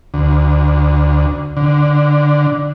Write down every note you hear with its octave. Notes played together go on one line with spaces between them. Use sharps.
D2
D3